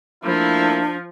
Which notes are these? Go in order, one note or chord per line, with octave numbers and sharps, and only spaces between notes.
F3 A3 A#3 D4 E4